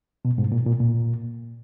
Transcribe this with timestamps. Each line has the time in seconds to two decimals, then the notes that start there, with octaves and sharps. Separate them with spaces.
0.25 B2
0.38 G#2
0.52 A#2
0.66 A#2
0.80 A#2